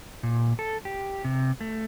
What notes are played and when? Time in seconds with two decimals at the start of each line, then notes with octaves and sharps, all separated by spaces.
0.23 A#2
0.59 A4
0.85 G4
1.25 C3
1.61 A3